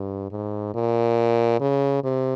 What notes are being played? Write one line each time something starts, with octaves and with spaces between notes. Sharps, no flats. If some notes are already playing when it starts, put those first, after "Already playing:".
Already playing: G2
G#2
A#2
C#3
C3